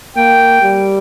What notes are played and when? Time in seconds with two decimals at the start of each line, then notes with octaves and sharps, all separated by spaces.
0.16 A#3 G5
0.62 G3